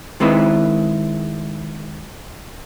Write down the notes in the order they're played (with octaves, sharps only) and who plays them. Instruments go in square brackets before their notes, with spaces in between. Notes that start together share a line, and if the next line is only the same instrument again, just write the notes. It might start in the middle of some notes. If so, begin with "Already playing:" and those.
[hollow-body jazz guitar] D#3 G#3 C4 E4 B4